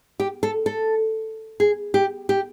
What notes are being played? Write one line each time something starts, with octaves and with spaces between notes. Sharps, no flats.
G4
A4
A4
G#4
G4
G4